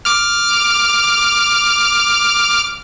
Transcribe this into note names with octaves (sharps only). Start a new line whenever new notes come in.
D6 F6